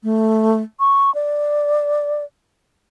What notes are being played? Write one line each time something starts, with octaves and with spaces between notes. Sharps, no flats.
A3
C#6
D5